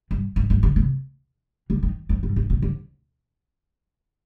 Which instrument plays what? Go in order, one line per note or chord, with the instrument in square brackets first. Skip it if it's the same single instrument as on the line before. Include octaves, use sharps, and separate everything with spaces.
[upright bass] G2
G#2
G#2
D3
C3
D3
D#3
F2
G2
G#2
B2
D3